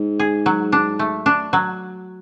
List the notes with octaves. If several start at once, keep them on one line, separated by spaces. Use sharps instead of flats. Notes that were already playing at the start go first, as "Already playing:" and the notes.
Already playing: G#2
G#4
F#3
D4
A3
D4
F#3